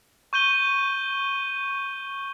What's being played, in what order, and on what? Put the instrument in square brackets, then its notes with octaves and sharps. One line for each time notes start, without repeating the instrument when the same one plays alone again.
[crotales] C#6 G6 D#7 G7